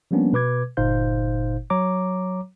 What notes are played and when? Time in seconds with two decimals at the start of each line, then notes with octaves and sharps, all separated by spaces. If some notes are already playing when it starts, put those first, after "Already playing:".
0.11 F3 G3 A#3 B3 C#4 D4
0.33 B2 B4 D6 G#6
0.77 G1 A#2 D#4 C5 F5 G6
1.70 F#3 C#5 A#5 D6